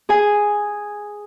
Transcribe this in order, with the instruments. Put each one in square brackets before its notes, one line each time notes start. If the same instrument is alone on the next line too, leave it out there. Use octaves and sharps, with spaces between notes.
[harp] G#4 G#5